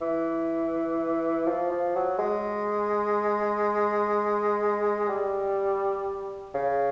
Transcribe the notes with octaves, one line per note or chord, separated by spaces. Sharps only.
E3
F3
F3
F#3
G#3
G3
C#3